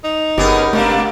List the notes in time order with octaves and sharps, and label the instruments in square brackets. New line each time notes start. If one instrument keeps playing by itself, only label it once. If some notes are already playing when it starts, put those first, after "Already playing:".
[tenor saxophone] D#4
[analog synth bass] G1 [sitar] B3 C#4 G#4 [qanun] G4 A#4
[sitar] C3 A#3 D4 [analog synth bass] A3